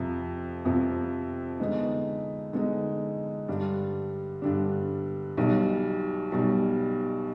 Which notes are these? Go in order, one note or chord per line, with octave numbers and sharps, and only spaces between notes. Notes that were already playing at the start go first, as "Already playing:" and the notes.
Already playing: F2 C3 F3
F2 C3 F3
D3 G#3 B3 D#4
D3 G#3 B3 D#4
G2 D3 G3 D4
G2 D3 G3 D4
B1 B2 G3
B1 B2 G3